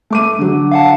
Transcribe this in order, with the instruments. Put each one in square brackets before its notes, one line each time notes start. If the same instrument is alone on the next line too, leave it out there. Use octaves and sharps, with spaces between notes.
[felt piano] A3 D6 D#7
D3 F#3
[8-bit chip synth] F5 F#5 A5